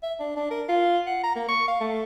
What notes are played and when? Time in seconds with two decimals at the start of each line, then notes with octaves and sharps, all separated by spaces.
0.03 E5
0.20 D4
0.36 D4
0.50 A#4
0.69 F4
1.06 F#5
1.24 A#5
1.36 A#3
1.48 C#6
1.68 F5
1.81 A3